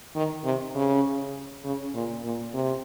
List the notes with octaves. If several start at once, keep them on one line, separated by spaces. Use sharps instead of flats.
D#3
C3
C#3
C#3
A#2
A#2
C3